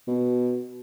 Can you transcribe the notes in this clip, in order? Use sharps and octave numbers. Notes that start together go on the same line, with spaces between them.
B2